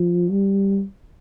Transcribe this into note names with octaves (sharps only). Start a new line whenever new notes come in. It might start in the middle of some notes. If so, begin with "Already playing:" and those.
Already playing: F3
G3